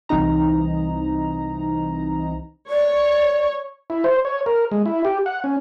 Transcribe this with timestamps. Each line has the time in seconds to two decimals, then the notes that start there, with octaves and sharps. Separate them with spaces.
0.09 C2 E3 C4 D#4 A#5
2.70 C#5 D5
3.90 E4
4.04 C5
4.25 C#5
4.46 A#4
4.71 G#3
4.86 E4
5.05 G4
5.26 F#5
5.44 C#4